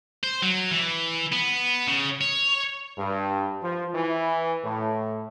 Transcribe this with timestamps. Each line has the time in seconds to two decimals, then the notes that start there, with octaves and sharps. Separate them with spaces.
0.24 C5
0.42 F#3
0.71 E3
1.33 B3
1.88 C#3
2.21 C#5
2.98 G2
3.62 F3
3.94 E3
4.64 A2